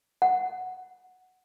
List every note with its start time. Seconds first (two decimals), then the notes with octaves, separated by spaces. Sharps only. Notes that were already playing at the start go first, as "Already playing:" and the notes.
0.22 F#5